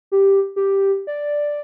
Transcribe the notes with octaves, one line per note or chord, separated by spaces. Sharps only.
G4
G4
D5